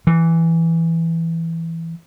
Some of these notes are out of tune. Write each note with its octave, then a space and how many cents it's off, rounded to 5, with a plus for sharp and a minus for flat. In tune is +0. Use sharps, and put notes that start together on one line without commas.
E3 +5